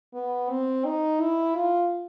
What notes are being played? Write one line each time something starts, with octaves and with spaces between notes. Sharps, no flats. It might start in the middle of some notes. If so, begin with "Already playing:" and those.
B3
C4
D#4
E4
F4